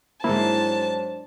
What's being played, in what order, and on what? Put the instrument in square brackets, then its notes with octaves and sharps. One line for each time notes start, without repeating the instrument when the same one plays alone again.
[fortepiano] G#2 A#3 [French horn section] F#3 D4 C5 [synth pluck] E4 [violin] A5